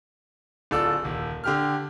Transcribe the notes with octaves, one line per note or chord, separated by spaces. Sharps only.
D1 F4 A4 D5 E6
D#1
D3 G4 F6